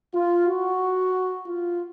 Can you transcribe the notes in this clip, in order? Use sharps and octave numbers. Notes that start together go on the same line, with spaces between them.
F4
F#4
F4